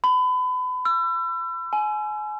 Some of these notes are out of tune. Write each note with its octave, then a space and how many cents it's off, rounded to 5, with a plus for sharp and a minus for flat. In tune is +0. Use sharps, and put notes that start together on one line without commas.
B5 +30
E6 +35
G#5 +30